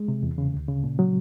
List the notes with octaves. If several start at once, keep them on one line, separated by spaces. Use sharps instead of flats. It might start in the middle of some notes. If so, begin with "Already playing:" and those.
Already playing: G#3
C3
E2
C#3
D2
C#3
A#2
F#3